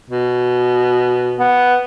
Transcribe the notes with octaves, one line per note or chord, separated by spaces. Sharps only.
B2
B3